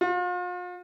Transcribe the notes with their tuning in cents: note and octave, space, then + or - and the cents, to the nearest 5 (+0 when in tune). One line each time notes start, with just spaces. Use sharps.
F4 +40